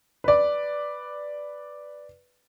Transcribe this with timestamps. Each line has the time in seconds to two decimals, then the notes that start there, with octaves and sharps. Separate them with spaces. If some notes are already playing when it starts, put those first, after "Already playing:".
0.24 B4 D5